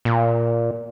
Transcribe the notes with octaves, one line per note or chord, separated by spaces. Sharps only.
A#2